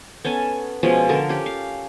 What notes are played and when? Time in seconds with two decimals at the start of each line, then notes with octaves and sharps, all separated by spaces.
0.24 B3 C#4 A4 G#5
0.83 B2 F3 G#3 C#4
1.09 D3 A4 A#4
1.29 C#4 G4
1.46 F5